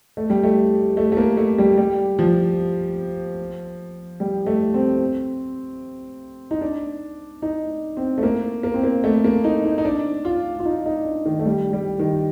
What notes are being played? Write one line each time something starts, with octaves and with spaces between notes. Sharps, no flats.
A3
G3
A3
A3
A3
A#3
A3
G3
G3
F3
G3
A3
C4
D#4
D4
D#4
C4
A3
A#3
A#3
C4
A#3
A3
A#3
D#4
D#4
D#4
D4
F4
F4
D#4
D#4
D4
D#3
A3
G3
G3
D#3